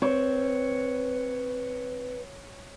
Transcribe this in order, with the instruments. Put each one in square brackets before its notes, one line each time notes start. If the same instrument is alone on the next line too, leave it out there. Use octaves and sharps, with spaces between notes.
[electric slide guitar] C4 [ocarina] B4 [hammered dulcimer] C#5